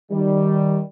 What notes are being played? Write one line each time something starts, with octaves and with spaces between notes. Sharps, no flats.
D#3 G3